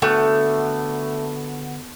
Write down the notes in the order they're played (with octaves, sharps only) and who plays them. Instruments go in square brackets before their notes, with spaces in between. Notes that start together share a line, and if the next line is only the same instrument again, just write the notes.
[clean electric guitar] D3 B3 F#4 [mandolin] A3